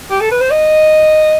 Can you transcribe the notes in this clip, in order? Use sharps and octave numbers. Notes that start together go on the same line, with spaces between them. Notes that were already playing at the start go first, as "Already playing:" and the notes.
G4
A4
B4
C5
D#5